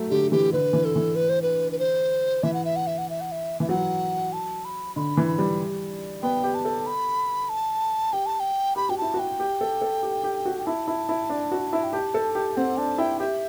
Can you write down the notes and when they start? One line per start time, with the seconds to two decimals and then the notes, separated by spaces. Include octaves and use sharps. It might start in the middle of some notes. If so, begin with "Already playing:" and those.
Already playing: F#3 A3
0.10 D3 G4
0.32 E3 G4
0.53 D3 B4
0.73 E3
0.85 A4
0.96 E3
1.15 B4
1.29 C5
1.42 B4
1.72 B4
1.79 C5
2.43 E3 E5
2.54 F#5
2.65 E5
2.76 F#5
2.87 E5
2.98 F#5
3.10 E5
3.21 F#5
3.32 E5
3.60 E3 E5
3.69 F#3 F#5
4.33 A5
4.65 B5
4.96 D3 B5
5.17 E3
5.27 B5
5.39 G3
6.23 B3 G5
6.44 G4
6.54 A5
6.65 A4
6.87 B5
7.49 A5
8.13 G4 G5
8.26 A5
8.40 G5
8.76 G4 B5
8.89 F#4 G5
8.98 E4 A5
9.14 F#4
9.19 G5
9.40 G4
9.61 A4
9.81 A4
10.03 G4
10.24 G4
10.46 F#4
10.59 G5
10.66 E4 A5
10.88 E4
11.09 E4
11.30 D4
11.52 F#4
11.73 E4
11.84 G5
11.93 G4 A5
12.14 A4
12.35 G4
12.57 C4 F#5
12.77 D4 A5
12.98 E4 G5
13.20 G4 E5